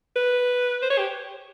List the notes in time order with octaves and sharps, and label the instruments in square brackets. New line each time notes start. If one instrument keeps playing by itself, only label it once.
[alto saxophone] B4
C5
C#5
G4